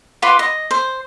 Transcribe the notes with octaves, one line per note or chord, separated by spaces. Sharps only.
F4 B4 C6 D6
D#5
C5